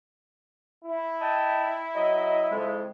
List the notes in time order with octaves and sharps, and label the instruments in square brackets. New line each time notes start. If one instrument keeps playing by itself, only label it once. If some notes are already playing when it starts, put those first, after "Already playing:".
[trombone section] E4
[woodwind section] D#5 G5 A5
F#3 D#5
F2 C#3 G#3